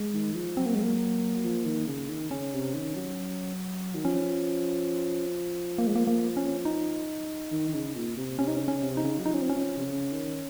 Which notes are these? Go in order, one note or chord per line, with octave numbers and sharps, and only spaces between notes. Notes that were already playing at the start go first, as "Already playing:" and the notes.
Already playing: G#3
D#3
F3
F#3 C4
A#3
G#3
A#3
F3
D#3
C#3
D#3
C#3 C#4
C3
D#3
F#3
D#3
F3 C#4
A#3
G#3
A#3
A#3
C#4
D#4
D#3
D#3
C#3
A#2
C3
C3 C#4
D#4
C#4
C#3
C#4
C3
D#4
C#3
F#3
F3 D#4
C#4
C4
C#4
F3
C3
C#3
D#3